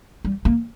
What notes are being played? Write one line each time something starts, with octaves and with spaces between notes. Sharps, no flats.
G3
A#3